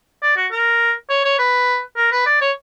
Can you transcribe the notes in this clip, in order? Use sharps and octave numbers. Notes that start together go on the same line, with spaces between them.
D5
F#4
A#4
C#5
C#5
B4
A#4
B4
D5
C#5